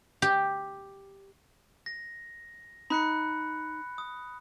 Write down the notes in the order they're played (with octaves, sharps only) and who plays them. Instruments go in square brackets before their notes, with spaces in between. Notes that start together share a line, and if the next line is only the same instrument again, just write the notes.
[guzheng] G4
[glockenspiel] A#6
[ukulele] D#4 [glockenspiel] B5 F#6 C#7
[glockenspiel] D#6